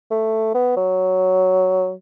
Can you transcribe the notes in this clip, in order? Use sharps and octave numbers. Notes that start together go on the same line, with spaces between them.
A3
B3
F#3